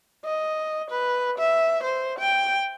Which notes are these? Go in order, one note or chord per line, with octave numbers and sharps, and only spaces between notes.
D#5
B4
E5
C5
G5